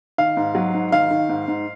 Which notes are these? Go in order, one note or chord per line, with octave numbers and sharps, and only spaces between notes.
D#3 F5
G#2
F#3
G#2
D#3 F5
D#3
G#2
G#2